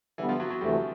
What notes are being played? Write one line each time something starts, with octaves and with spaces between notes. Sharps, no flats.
D3 E3 G3 B3
F3
F#3
F#3
D2 C3 E3 G3 A3